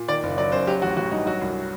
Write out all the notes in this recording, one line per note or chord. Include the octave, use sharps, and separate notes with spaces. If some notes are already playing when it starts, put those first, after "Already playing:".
Already playing: A#2
D#3 D5
F#1
F#3 D5
F#2 C5
F#3 G4
A1 F#4
A1 F#4
G2 D#4
F#3 F#4
C2